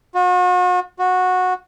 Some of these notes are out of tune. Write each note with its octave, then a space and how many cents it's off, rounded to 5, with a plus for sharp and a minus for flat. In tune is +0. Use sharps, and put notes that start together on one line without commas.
F#4 -40
F#4 -15